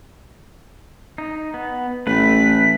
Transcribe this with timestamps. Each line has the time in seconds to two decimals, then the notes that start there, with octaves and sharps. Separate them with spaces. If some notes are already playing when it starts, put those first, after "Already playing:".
1.18 D#4
1.54 B3
2.07 A1 A3 B4 B6